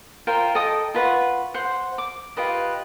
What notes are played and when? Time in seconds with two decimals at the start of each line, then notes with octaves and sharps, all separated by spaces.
0.27 F4 A#4 C5 G5
0.55 A4 D#5 G5 D#6
0.94 F4 B4 F#5 C#6
1.54 C5 F#5
1.98 D6
2.37 F4 G4 B4 D#5